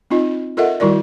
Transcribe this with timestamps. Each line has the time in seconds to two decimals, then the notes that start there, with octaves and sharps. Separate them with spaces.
0.11 C4 D#4 F4 D#5
0.57 F4 A4 A#4 D#5 E5 F#5
0.80 D#3 G3 E4 F#4 A#4 D5